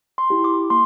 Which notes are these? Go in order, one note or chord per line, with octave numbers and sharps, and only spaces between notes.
C6
E4 G4
D6
A#3 C6